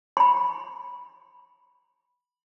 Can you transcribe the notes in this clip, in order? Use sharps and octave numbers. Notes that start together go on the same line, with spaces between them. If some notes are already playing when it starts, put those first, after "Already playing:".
B5 C6